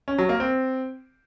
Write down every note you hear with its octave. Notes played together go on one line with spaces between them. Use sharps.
C#4
F#3
A#3
C4